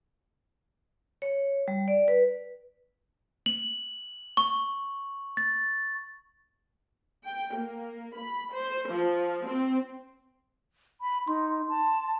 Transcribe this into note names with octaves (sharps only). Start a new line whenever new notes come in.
C#5
G3
D5
B4
F#7
C#6
A6
G5
A#3
B5
C5
F3
C4
B5
D#4 C6
A5